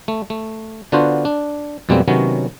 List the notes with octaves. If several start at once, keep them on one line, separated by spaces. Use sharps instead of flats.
A3
A3
D3 B3 D4 F4 F#4 C5
D4
F2 B2 G3 G#3 A#3 C4
C3 D#3 F#3 B3 C#4